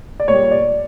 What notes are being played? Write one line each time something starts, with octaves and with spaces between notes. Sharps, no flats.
D5
A#2 G3 C#5
D5